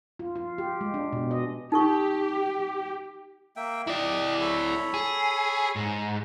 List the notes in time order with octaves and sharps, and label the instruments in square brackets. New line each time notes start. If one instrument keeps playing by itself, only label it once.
[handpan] F4
F4
G4
G#3
D4
B2
D#5
[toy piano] D#4 A4 C#6 [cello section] G4
[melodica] A#3 E5 G5
[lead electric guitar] E4 D5 [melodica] G4 D#5
[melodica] A4 C#5 B5
[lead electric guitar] G#4
G#2